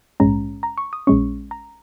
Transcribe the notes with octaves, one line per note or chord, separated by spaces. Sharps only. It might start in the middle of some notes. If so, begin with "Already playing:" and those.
A#1 G#2 G#3 C#4 A#5
A#5
C#6
D#6
A#1 A#2 G#3 C#4 C#6
A#5